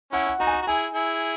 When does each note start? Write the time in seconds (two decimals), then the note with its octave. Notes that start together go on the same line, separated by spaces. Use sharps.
0.12 C#4 E4 F#5
0.27 F#5
0.39 D#4 F#4 A#5
0.47 G#5
0.53 A#5
0.62 F#4
0.67 E4 G#4 G#5
0.94 E4 G#4